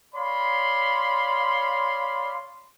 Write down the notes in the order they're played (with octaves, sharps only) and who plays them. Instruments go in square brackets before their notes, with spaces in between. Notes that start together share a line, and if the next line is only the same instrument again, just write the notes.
[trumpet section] C#5 D5 F5 B5 C6